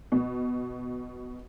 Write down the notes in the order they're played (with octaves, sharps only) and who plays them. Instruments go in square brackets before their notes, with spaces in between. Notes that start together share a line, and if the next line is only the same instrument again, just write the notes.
[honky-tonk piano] B2